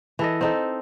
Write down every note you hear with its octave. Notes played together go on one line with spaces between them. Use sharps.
E3 A4 D#5
C4 D#4 A4